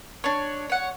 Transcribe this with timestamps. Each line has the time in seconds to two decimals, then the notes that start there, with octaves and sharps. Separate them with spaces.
0.24 D4 C#5
0.70 C#5 F#5